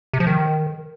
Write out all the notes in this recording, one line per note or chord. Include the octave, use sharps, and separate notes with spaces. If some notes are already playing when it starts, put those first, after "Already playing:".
C3
F3
D#3